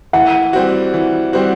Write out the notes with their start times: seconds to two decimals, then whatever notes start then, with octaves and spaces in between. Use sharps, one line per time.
0.13 E3 F#5
0.53 G3 C4 F#4
0.94 E3
1.33 G3 C4 F#4